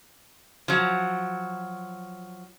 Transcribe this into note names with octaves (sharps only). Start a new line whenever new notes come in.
F3 F#3